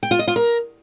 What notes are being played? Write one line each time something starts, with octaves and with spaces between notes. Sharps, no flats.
G5
F4
D#5
F4
A#4